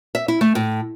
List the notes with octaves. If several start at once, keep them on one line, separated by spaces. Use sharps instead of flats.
E5
E4
A3
A2